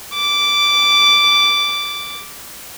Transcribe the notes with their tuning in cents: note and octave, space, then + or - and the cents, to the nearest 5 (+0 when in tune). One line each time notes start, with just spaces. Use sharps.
D6 -10